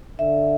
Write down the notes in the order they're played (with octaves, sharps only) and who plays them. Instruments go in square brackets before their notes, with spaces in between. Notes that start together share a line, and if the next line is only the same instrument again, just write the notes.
[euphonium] D3 [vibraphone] E5